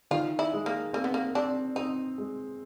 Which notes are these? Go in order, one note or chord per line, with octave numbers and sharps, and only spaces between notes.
D#3 F4
E4
G#3
A#3
A#3 C4
B3
A#3
C4 D4
C4 D#4
G#3